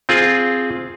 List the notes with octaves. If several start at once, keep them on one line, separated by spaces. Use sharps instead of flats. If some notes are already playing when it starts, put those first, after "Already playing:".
C4 F4 G#4